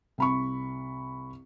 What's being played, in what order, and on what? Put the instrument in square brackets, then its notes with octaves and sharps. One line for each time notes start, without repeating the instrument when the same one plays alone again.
[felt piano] C2 B5 C#6